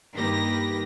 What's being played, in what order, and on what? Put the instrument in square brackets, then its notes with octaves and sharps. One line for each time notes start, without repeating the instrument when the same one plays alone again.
[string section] G2 D#3 A#3 G4 B4 A#6